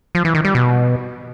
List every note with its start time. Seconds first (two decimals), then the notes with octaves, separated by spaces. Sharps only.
0.15 F3
0.25 E3
0.35 D#3
0.45 G3
0.55 B2